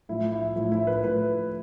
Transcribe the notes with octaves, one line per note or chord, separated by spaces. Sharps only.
A2 F3 E4
E4
A2 F3 E4
E4
B4
A2 F3 B4